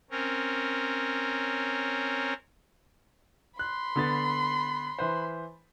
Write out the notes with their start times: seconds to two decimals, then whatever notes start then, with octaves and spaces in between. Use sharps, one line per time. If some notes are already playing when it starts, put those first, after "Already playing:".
0.11 C4 C#4 A#4
3.59 B5 C6 F#6
3.96 D3 B3 A6
4.99 E3 B4 C5